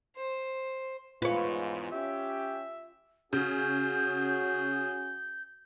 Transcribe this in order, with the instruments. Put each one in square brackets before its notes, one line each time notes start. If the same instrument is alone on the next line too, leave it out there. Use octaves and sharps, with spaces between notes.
[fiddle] C5
[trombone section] E2 G#2 [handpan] F4 [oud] B4 C#5
[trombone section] C#4 G4 [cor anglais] E5
[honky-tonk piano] C#3 [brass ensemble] C#4 F#4 G#4 [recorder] G6